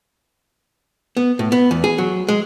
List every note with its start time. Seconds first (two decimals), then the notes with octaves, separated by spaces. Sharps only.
1.17 B3
1.39 A2
1.52 B3
1.71 E2
1.84 G#4
1.98 F#3
2.29 G#3